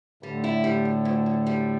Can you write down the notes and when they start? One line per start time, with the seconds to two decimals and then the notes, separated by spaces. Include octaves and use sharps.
0.23 A2 D3 G3
0.44 E4
0.64 G3
0.85 D2
1.05 D2
1.26 D2
1.46 G3